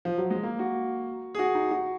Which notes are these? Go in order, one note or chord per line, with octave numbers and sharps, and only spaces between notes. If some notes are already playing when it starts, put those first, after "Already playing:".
F3
F#3
G#3
A#3
F#4
G#4
F#4
D#4
F#4